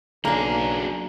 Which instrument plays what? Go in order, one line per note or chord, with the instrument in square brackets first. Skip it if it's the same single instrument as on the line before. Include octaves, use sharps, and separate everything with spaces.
[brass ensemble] B1 [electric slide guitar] F#3 G#4 [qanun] A#3 D4 [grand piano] A#5